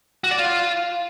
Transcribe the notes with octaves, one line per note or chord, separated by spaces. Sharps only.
F#4
D5
F4